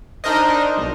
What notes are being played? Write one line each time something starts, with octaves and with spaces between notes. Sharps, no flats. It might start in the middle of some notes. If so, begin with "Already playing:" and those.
D4 D#4 A#4 C5 D#5
B1